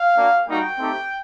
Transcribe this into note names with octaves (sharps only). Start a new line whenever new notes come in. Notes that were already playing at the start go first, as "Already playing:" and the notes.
Already playing: F5
A#3 D4 F#4
G3 A#3 D#4 F#4 G5
A3 C4 D#4 G4